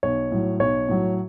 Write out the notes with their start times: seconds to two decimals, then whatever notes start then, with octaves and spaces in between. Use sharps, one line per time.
0.03 B1 C#5
0.32 A2 F#3
0.60 B1 C#5
0.88 A2 F#3